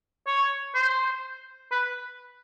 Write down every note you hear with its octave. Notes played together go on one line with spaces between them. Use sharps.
C#5
C5
B4